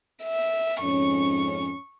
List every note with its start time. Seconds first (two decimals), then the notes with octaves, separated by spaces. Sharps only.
0.24 E5
0.81 F2 G#2 C#4 C#6